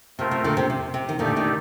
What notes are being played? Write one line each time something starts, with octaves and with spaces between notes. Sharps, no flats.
C3 A3 C4 F4 A#4
C3
A#2 D3
C3
C3
C3
D#3
A#2 D3 A3 D#4 G4 D5
C3 D#3